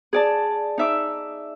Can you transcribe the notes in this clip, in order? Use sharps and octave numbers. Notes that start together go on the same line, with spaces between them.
G#4 D5 A5
D#4 E5 D6